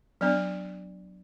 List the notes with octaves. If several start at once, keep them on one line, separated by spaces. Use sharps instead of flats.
F#3 B3 D4 D5